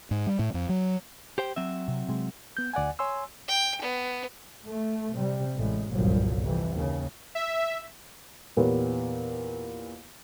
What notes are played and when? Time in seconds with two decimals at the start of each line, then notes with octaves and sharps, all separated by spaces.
0.11 G#2
0.27 G3
0.39 A2
0.54 F2
0.69 F#3
1.38 G4 C5 G5
1.56 F#3 C4 E5
1.88 C3
2.09 C3 G#3
2.57 B3 G6
2.74 D2 D5 F#5 G#5
2.99 C#5 G#5 C6 E6
3.48 G5
3.81 B3
4.67 A3
5.13 C3 G3
5.55 A1 A2 G#3
5.90 G1 C2 F#2 A#2 F3 F#3
6.42 F2 C3 E3
6.73 D#2 C#3
7.35 E5
8.57 E2 A#2 B3 G4 C#5